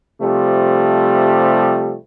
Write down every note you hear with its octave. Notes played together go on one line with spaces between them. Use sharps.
C3 F3 G3 A3